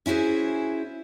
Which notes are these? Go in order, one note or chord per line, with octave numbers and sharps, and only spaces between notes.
C#4 E4 F#4 G#4 C5